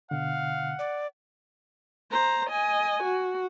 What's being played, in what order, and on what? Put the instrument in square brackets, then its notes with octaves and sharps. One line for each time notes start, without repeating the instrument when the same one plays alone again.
[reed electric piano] B2 D3 [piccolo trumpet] F5 [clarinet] F#5
[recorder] D5
[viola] C5 A#5
D#5 G#5
F#4